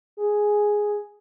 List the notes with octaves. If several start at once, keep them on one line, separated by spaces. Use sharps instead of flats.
G#4